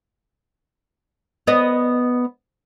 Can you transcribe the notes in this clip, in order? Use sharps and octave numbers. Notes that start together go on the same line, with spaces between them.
B3 D#5